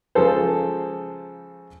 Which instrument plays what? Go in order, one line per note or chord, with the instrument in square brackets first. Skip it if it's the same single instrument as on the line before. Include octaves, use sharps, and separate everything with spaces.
[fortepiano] C#3 F3 G#3 A4 C5